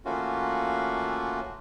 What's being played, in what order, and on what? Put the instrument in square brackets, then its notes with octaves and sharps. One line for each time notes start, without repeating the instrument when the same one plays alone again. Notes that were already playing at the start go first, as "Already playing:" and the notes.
[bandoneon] E3 A3 A#3 C#4 F4 F#4